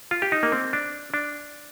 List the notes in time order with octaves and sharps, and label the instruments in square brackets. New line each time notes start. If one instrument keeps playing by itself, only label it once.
[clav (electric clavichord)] F4
G4
D#4
A#3
C4
D4
D4